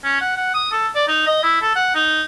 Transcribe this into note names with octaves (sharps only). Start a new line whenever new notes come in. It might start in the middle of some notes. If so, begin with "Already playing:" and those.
C#4
F#5
F#5
D#6
A4
D5
D#4
D#5
E4
A4
F#5
D#4